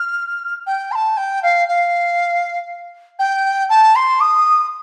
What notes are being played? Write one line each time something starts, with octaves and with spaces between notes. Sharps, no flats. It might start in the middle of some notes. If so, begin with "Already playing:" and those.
Already playing: F6
G5
C6
A5
G5
F5
F5
G5
A5
C6
D#6